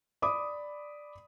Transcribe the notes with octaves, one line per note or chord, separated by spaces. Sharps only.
D5 B5 D6 D#6